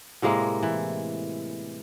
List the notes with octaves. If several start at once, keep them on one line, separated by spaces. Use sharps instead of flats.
A2 C3 G#3 A#3
E3